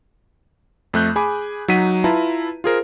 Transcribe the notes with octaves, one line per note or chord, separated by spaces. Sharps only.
F2 A3 F#6 G6
G#4 G#5 B5 D6
F#3 D#4 F#5 B6 D#7
E4 F4 B4 A5 A#5
F4 G#4 A#4 C5